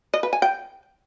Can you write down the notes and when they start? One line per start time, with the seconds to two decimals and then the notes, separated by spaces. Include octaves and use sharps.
0.14 D#5
0.23 B4
0.33 G#5
0.42 G5